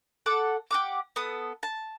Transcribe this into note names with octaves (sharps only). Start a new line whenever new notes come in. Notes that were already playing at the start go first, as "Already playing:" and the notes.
A4 F#5 D6
G4 F#5 D6
B3 A4 D#6
A5